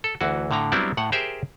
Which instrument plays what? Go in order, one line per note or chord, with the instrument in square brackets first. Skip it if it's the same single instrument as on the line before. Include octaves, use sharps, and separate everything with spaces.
[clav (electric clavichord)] A4
D2 E3 F#4
A2 D3 A#5
F#3 G3 B3 C4 D4 E4
A2 F#5
G4 G#4 A#4 C5 E5 G5